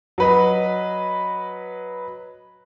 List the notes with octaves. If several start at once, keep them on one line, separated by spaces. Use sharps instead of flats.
F#3 B4 D#5